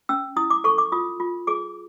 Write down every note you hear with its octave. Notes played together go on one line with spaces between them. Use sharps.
C#4 E6
E4 D#6
D6
A4 C#6
D6
F4 D#6
F4
G#4 D6